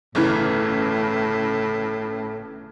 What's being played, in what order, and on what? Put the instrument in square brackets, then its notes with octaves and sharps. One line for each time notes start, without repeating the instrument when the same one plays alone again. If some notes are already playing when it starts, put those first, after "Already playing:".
[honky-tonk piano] G1 C#3 E3 [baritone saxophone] A2